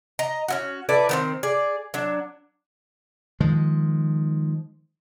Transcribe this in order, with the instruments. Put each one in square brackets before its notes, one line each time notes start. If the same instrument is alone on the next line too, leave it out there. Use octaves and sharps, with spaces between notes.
[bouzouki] D#5 A#5
C#4 E4 F#4
E4 A4 B4 D5
D#3 B3 C4
G#4 D5
F#3 D4
[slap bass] D#3 F3 G#3